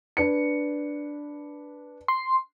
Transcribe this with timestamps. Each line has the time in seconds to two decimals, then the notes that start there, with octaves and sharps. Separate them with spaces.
0.17 D4 B4 C#7
2.08 C6